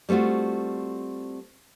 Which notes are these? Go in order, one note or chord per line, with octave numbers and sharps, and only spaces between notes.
G3 A3 C4 F4 F#4